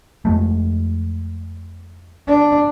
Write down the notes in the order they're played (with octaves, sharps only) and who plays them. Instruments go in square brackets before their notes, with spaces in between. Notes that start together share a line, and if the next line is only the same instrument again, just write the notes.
[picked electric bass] F2 G#3 A3
[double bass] D4